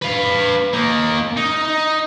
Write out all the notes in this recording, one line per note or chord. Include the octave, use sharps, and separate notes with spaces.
B4 F5
A#3 D#4
D#4